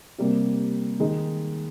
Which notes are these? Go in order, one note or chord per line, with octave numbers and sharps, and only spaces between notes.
C3 G3 A#3
D#3 G#3 D#4